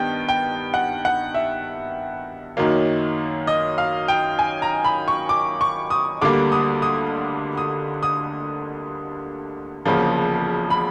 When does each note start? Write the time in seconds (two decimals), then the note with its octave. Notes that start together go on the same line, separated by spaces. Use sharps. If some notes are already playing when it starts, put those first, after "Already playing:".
Already playing: G2 D#3 B3 G5
0.29 G5
0.74 F#5
1.05 F#5
1.34 E5
2.57 F#2 D#3 F#3 A#3
3.47 D#5
3.78 F5
4.08 G5
4.39 G#5
4.62 A#5
4.84 B5
5.08 C#6
5.29 D6
5.61 C#6
5.90 D#6
6.22 D2 D3 G3 A#3 D6
6.52 D#6
6.82 D#6
7.57 D#6
8.03 D#6
9.85 E1 D2 C#3 F3 A#3
10.70 B5